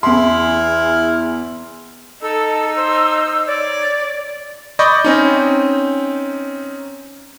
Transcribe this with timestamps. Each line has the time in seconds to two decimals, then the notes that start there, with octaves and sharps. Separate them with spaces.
0.03 E2 E4 G#4 C6 F6
2.22 D#4 A4 E6
2.76 C5
3.47 C#5 D5
4.79 D5 D#5 B5 C#6 G6
5.04 C4 C#4 D#4